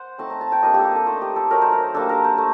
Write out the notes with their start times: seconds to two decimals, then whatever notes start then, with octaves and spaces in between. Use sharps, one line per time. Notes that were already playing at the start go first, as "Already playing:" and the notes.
Already playing: C5 F#5
0.18 A3 C4 D#4 A5
0.30 A#5
0.41 A5
0.52 G5
0.63 G3 A#3 D4 D#5
0.74 G4
0.79 A4
0.85 G4
0.96 A4
1.07 A3 D#4 C5
1.22 G4
1.36 A4
1.51 F#3 A3 D#4 A#4
1.62 C5
1.72 A#4
1.94 G3 A#3 D4 A4
2.09 A#4
2.24 C5
2.38 A3